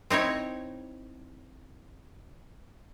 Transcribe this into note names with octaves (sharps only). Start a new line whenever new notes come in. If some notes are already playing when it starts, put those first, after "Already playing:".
C4 D#4 E4 C#5